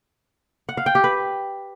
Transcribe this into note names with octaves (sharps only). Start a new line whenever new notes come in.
F#5
F5
G5
G4
B4